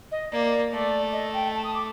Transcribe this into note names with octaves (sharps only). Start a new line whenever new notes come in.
D#5
A#3 D5
A3 D5
D#5
G5
A5
D#6
D6